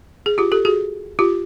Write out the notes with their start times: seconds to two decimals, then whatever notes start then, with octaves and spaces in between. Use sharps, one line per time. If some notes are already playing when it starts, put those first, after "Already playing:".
0.26 G#4
0.38 F4 G4
0.52 G4 A4
0.65 F#4 G#4
1.19 F4 G4